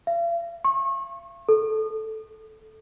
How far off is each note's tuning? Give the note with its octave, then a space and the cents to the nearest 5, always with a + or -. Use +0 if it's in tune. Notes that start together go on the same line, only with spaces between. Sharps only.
F5 -45
C#6 -35
A4 -5